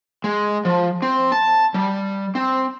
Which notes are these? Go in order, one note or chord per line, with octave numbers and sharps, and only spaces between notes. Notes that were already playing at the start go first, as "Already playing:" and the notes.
G#3
F3
C4
A5
G3
C4